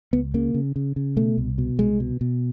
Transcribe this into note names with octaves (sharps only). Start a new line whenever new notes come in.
C#2 B3
C#3 A#3
C#3
C#3
C#3
B2 A3
C2
B2
C2 G#3
B2
B2